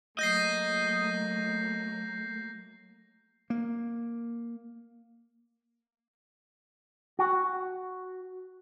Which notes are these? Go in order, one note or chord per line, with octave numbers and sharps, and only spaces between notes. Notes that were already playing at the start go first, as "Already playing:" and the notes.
F#3 A3 A#3 D#5 G6 A#6 C7
A#3
F#4